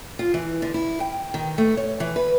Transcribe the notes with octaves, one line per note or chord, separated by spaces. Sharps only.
F4
E3
D3
E4
G5
D#3
A3
C#5
E3
B4